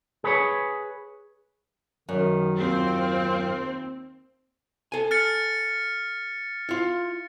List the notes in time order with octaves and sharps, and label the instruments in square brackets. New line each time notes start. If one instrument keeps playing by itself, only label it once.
[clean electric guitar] G#4 B4 C#5
[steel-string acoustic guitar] F#2 [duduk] D#3
[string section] D#2 C4 [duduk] F4
[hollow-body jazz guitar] A4 G#5
[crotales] F6 A6 C#7
[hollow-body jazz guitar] E4 F4